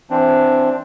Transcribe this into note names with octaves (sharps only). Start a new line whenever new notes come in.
E3 C4 D4